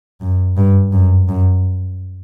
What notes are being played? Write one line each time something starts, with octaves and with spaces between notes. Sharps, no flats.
F#2
G2
F#2
F#2